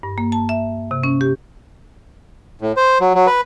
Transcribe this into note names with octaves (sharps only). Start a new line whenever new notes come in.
G2
A#3
A5
E5
C3
C#4
G4
A2
C5
F#3
F#3
B4